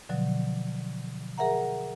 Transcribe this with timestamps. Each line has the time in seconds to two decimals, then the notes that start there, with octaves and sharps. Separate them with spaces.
0.09 B2 D3 F3 F#3
1.38 G#4 A#4 E5 F#5 A#5